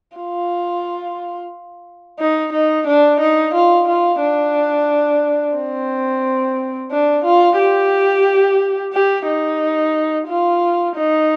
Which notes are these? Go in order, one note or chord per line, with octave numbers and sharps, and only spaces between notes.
F4
D#4
D#4
D4
D#4
F4
F4
D4
C4
D4
F4
G4
G4
D#4
F4
D#4